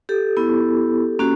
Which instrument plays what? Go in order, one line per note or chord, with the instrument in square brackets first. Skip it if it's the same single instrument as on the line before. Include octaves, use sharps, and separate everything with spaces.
[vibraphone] G4 A4
B3 E4
A#3 C#4 F#4